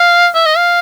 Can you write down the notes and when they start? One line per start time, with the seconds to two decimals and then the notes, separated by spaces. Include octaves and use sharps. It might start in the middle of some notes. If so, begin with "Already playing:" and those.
Already playing: F5
0.34 E5
0.46 D#5
0.57 F5